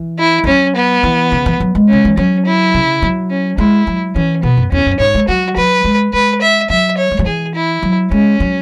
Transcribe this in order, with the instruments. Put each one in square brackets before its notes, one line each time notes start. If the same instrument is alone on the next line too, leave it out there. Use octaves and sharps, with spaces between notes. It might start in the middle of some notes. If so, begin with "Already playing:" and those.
Already playing: [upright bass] E3
[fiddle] E4
[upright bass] E3
[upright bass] F#3 [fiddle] C#4
[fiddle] B3
[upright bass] E3
C#3
E3
F#3
G#3
[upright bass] C#3 [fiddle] C#4
[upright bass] E3
[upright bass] F#3 [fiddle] C#4
[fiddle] E4
[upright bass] C#3
F#3
[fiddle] C#4
[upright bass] G#3 [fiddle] E4
[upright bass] F#3
[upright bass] E3 [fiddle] C#4
[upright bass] B2 [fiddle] B3
[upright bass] F#2
[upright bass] E2 [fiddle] C#4
[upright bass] F#2
[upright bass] G#2 [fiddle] C#5
[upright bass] G#3
[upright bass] F#3 [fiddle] F#4
[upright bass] F#3 [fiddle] B4
[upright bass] G#3
[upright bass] G#3 [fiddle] B4
[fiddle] E5
[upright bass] F#3 [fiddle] E5
[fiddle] C#5
[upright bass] G#3
F#3
[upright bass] E3 [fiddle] G#4
[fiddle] E4
[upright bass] F#3
[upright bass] G#3 [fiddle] C#4
[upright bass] F#3